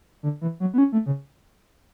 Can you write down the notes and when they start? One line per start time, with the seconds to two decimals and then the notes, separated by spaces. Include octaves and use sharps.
0.23 D3
0.41 E3
0.60 F#3
0.74 B3
0.78 C#4
0.92 A3
1.06 C#3